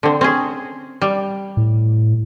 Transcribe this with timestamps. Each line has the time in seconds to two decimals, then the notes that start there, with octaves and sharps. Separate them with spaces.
0.03 D3 C4
0.21 C4 C#4 G#4
1.02 G3
1.57 A2